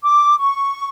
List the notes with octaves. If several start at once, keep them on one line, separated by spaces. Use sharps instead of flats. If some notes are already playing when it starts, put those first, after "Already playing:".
D6
C#6